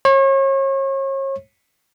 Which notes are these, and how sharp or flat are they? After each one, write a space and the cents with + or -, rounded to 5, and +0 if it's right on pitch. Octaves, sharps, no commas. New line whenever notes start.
C#5 -35